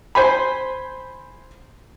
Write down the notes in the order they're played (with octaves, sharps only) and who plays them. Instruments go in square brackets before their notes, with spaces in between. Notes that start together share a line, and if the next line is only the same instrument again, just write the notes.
[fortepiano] C5 G#5 B5